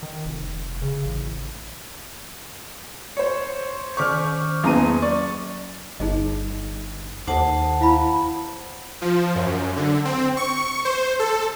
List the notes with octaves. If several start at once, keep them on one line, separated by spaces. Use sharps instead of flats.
D#3
F1
C#3
A1
C5 C#5 C#7
D#3 C5 C#6 D6 F6 G6
E2 F#3 A#3 C#4 A#5 D#7
D5 C#6
G1 D#4 G#4 D#5
D#2 A4 C5 F#5 A5 D6
E4 F5 B5
F3
F#2
D3
C4
C#6
C5
A4